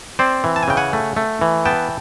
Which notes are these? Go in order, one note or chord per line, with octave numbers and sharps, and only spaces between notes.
C4 C5 D5
E3
A5
G#5
C#3 G5
F#5 G#5
A3
A3
E3
B3 G5 A5